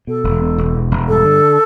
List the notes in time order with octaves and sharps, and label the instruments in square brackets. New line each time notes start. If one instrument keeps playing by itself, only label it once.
[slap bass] B2 [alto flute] A4
[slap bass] E1
B2
E1
E2
E1
[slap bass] G2 [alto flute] A4
[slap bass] D3